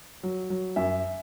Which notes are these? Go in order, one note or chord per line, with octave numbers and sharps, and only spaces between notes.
F#3
F#3
F#2 E5